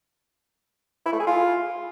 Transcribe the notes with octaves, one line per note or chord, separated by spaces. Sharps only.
E4
A3
G#4
F4